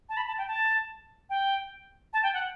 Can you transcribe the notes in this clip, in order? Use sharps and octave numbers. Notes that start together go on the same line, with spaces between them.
A5
B5
A5
G5
A5
G5
A5
G5
F#5